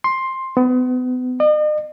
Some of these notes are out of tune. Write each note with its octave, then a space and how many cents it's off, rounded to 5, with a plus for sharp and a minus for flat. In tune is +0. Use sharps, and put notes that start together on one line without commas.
C6 +10
B3 +35
D#5 -45